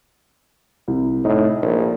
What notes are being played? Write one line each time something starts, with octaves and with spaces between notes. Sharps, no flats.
C2
A2 D#4
A#1